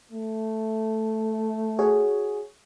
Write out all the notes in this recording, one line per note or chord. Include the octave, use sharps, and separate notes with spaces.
A3
F#4 G#4 C#5